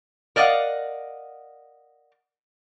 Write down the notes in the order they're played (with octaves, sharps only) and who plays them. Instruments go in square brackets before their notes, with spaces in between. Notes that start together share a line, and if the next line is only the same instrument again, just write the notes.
[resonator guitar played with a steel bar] A#4 D5 D#5 F5 F#5